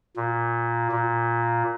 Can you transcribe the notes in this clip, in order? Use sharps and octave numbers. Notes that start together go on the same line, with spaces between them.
A#2
A#2